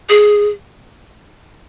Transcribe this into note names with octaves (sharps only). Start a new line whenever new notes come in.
G#4